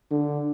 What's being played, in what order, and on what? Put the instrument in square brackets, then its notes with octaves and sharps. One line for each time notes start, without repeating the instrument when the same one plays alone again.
[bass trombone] D3